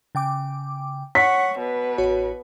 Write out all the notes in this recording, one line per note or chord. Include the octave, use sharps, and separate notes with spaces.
C#3 G5 D6
C#5 F#5 C#6 B6
B2 B4
A1 F#4 C#5